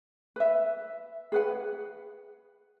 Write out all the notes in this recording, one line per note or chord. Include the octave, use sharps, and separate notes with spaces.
B4 E5
G#4 B4 F#5